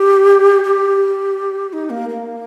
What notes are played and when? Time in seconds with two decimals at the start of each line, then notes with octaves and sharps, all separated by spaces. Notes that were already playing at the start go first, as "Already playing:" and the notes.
Already playing: G4
0.64 G4
1.73 D#4
1.90 A#3
2.09 A#3